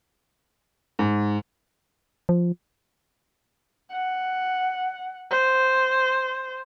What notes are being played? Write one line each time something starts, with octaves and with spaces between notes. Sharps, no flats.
G#2
F3
F#5
C5